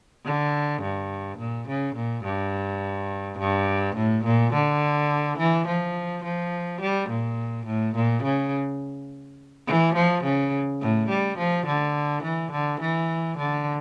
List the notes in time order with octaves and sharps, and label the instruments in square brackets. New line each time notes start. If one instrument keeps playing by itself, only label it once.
[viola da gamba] D3
G2
A#2
C#3
A#2
G2
G2
A2
A#2
D3
E3
F3
F3
G3
A#2
A2
A#2
C#3
E3
F3
C#3
A2
G3
F3
D3
E3
D3
E3
D3